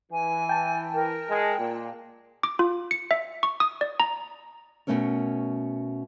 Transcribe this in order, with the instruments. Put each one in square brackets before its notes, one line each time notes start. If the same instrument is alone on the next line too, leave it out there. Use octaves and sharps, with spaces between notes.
[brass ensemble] E3 [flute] G#5
[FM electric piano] G5 A5
[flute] A#4
[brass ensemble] G#3
A#2
[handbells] D6
F4
C#7
E5
C#6
D#6
D5
A#5
[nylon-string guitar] B2 D3 A3 C#4 A#4 C#5